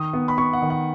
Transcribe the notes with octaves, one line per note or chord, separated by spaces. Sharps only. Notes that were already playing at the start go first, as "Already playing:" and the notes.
Already playing: D#3 D#6
B3
B5
B3 C#6
F#5
D#3
F#5